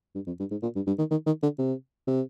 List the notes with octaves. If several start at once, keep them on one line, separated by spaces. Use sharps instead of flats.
G2
F2
G2
G#2
A#2
G2
G2
D#3
D#3
D#3
D3
C3
C3